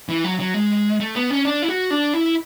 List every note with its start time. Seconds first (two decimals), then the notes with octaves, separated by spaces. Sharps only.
0.09 E3
0.24 F#3
0.40 F#3
0.54 G#3
1.00 A3
1.16 B3
1.30 C#4
1.45 D4
1.62 E4
1.69 F#4
1.91 D4
2.14 E4